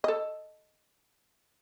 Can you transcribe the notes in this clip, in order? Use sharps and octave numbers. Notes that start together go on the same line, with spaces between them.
A4 D#5